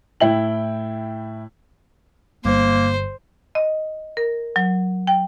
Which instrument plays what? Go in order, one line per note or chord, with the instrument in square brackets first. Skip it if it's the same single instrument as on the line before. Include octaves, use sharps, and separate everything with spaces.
[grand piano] A2 E4 G5 F#7
[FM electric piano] G1 [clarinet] A#3 [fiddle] C5
[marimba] D#5
A#4
F#3
G5